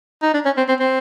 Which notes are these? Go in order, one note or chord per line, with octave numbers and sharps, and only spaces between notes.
D#4
D4
C#4
C4
C4
C4